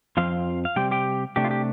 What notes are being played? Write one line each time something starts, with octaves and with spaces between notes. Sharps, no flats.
F2 F3 C4 F4 F5
F5
C3 G3 C4 G4 G5
G4 G5
C3 A3 D4 G4
F4
G4